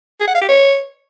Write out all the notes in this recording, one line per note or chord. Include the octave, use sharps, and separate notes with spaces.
G#4
F#5
F5
G4
C#5